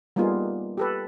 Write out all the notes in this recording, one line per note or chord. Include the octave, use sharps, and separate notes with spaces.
G3 A#3 B3 D#4 F4 G#4
G4 A4 B4